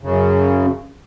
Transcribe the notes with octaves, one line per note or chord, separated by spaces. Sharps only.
F#2 C#3